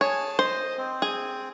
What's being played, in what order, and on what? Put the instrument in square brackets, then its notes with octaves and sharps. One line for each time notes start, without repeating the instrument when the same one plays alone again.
[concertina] G#4 G#5 A5 [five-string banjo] C#5
[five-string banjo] C5 [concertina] D#5
[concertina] C4
[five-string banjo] G#4